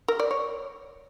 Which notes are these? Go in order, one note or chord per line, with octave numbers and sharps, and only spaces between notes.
A#4
D5
C#5